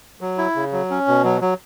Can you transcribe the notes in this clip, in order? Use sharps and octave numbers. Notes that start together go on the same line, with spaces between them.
F#3
E4
C#3
F#3
C#4
B2
F#3
F#3